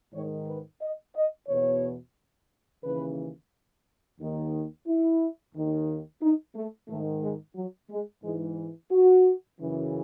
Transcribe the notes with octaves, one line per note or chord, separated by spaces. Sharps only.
G#2 D#3 C#5
B4
D#5
D#5
E2 B2 C#5
D#2 C#3 E3 B4
D#2 D#3
E4
D#2 D#3
D#4
A3
G#2 D#3 A3
G#3
F#3
G#3
G#2 E3 G#3
F#4
F#2 C#3 E3